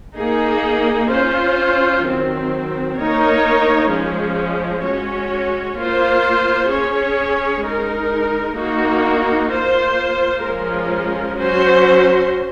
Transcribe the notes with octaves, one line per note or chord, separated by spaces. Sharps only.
A#3 D#4 G#4
C#4 F4 C5
D#3 F#3 C4
A#3 D#4 A#4 C#5
F3 G#3 C#4 G#4
G#3 C#4 F#4 C#5
A#3 F4 C5
C#4 G#4 C#5
G#3 D#4 A#4
A#3 D#4 F#4
A#3 F4 C5
F3 G#3 C#4 F4 A#4
F#3 C#4 F#4 C5